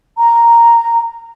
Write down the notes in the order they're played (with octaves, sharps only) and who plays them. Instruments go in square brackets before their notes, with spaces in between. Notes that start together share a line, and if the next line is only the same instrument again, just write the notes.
[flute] A#5